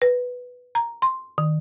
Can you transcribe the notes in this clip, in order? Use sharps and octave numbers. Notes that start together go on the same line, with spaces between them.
B4
A#5
C6
D#3